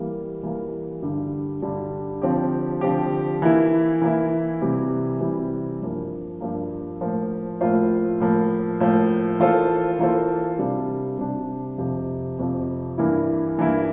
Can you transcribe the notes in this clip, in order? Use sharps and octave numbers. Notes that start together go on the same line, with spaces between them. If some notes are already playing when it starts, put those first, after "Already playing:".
Already playing: E3 G3 A#3
E3 G3 A#3
G2 D3 G3
G2 D3 G3
D3 F3 C4 G4
D3 F3 C4 G4
E3 A#3 E4
E3 A#3 E4
C3 E3 G3
C3 E3 G3
G2 F3 A#3
G2 F3 A#3
A2 F3 A#3 F4 C5
A2 F3 A#3 F4 C5
A2 F3 A#3
A2 F3 A#3
E3 A#3 F4 A4 C5
E3 A#3 F4 A4 C5
C3 G3 D4
C3 G3 D4
F2 C3 F3
F2 C3 F3
G2 E3 A#3 E4
G2 E3 A#3 E4